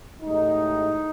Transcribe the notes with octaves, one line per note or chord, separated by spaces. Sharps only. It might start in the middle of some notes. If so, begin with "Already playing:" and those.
A1 A2 G#3 D#4